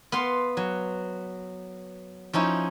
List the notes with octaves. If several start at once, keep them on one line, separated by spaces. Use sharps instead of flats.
B3 F5 C6
F#3
F3 C#4 D#4 E4